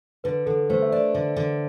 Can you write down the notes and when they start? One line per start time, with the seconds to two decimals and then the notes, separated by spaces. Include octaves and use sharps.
0.24 D3 B4
0.46 D3 A4
0.70 A3 C5
0.82 E5
0.92 D4 D5
1.15 D3
1.36 D3